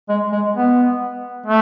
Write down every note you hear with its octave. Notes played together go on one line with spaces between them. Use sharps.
G#3
G#3
B3
A3